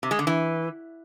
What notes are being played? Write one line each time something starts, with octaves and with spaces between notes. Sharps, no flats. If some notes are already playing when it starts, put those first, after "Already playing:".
C3
G#3
D3
E3